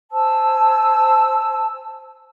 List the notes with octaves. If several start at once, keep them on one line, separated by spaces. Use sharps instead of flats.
C5 G#5 A5 E6